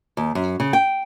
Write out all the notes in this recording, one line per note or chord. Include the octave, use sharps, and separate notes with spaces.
D#2
F#2
C#3
G5